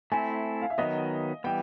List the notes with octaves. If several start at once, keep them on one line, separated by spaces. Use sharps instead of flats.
A3 C4 E4 G#5
F5
E5
D#3 F#3 B3 D#5
E3 G3 B3 G5